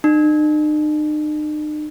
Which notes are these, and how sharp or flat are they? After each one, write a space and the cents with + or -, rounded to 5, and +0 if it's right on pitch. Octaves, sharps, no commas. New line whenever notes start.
D#4 -45